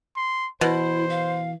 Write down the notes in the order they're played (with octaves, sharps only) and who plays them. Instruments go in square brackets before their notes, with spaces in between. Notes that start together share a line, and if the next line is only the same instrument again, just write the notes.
[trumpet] C6
[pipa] B2 [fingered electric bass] E3 [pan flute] E4 [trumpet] C5
[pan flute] F5